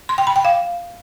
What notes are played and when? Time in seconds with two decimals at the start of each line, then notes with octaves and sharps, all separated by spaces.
0.09 C6
0.18 G5
0.27 B5
0.36 G5
0.45 F5